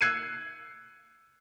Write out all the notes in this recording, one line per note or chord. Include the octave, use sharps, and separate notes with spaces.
E6 F#6 G#6 C7 C#7 D#7